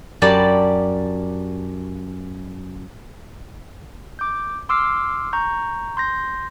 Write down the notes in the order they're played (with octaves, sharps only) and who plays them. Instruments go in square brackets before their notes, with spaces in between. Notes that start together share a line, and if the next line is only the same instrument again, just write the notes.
[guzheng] F#2 G4 D5 A5 B5
[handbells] D6 G6
C6 D6 E6 F6 C7
A#5 C#6 G6
C6 G6 A#6